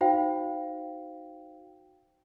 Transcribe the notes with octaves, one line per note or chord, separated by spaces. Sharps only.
D#4 F#4 C5 F5 G5